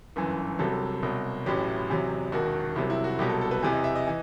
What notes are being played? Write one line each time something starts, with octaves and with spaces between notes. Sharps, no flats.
G1 F#2 E3
C2 C3 F#3 A4
C2 B2 F#3
A1 A2 F#3 G4
E2 C3 F#3
E1 D#2 D#3 F#4
C2 C3 F#3 E4
E4
F#4
C2 B2 F#3 G4
A4
A4
B4
E2 C3 E3 C5
D#5
E5
D#5
E3